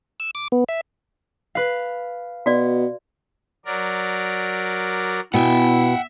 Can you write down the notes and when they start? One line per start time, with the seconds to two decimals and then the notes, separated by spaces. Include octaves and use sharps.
0.20 E6
0.35 D6
0.52 B3
0.69 E5
1.55 B4 F5
2.46 B2 F#4 D5
3.66 F#3 A#4 D5
5.34 B2 B3 E4 E5 F#5 G5